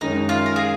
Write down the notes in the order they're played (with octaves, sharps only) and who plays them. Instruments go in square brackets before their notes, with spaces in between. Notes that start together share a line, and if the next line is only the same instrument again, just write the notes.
[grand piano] F#2 D#3 G#3 C#4 [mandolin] D#4
[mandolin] F4
A#4
G#4